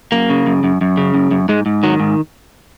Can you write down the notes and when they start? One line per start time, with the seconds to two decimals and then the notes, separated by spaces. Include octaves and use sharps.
0.12 F#2 A#3
0.30 C#3
0.47 F#2
0.64 F#2
0.81 F#2
0.97 C#3
1.14 F#2
1.31 F#2
1.49 G#2 G#3
1.66 G#2
1.83 D#3 F#3
2.00 G#2